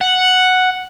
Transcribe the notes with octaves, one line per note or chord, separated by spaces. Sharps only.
F#5